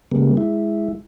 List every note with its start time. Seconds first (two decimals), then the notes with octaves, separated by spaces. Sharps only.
0.12 C#3 G3 G#3 A#3 B3
0.37 G#3 E4